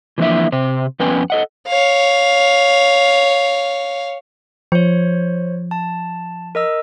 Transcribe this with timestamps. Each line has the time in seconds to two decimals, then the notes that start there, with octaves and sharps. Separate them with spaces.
0.18 E3 F3 A#3 D4 E4 E5
0.52 C3 C4 C5
1.00 F2 B3 C#4 B4 G5 G#5
1.30 A4 D#5 F#5
1.68 C#5 F5
4.72 F3 C5 C#5
5.71 A5
6.55 A#4 D#5 E6